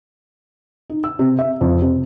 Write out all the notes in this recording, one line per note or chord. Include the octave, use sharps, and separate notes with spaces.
D#4
E6
C3
E5
F2
C3